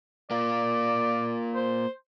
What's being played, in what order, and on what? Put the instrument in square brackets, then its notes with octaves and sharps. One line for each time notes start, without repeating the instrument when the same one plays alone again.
[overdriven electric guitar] A#3 F4 [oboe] D5
[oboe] C5